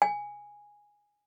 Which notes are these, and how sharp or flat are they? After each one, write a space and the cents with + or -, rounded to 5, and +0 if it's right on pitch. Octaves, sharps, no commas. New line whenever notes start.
G#5 -10